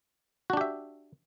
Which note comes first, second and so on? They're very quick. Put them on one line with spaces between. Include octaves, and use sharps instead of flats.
F#4 D4 G4 E5